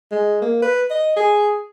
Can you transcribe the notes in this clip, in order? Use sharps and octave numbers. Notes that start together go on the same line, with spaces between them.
G#3
A#3
B4
D#5
G#4